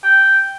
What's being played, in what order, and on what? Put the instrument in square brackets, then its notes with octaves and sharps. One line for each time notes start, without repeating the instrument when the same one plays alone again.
[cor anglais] G5